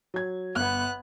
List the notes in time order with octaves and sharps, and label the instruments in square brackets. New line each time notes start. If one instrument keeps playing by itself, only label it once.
[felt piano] F#3 G#6
[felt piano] G1 [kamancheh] B3 F#6